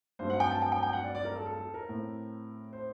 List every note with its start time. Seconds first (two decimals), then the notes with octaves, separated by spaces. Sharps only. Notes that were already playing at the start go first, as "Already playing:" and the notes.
0.19 G2 F#3 A3 C4 C5
0.30 F#5
0.40 G5
0.51 A5
0.62 G5
0.72 G5
0.83 G5
0.93 F#5
1.04 D5
1.15 D5
1.25 A#4
1.35 A4
1.46 A4
1.60 A4
1.74 A#4
1.89 A2 A3 C4
2.73 C5